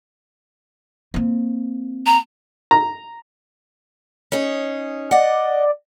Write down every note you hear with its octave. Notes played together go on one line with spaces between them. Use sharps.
A#3 C4
A#5
A#5
C#4 D#4 G#4
D5 D#5 F#5